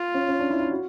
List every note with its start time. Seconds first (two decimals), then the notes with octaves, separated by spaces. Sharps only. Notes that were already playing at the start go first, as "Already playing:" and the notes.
Already playing: F4
0.14 C#4
0.29 C#4
0.40 D4
0.50 E4
0.60 E4
0.71 F#4